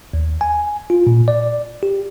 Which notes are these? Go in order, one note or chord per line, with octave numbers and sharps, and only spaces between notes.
D#2
G#5
F4
A#2
D5
G4